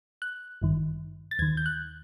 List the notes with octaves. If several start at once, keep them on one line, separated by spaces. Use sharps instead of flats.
F#6
G#1 G2 D#3
A6
D#2 D#3 G#6
G6
F#6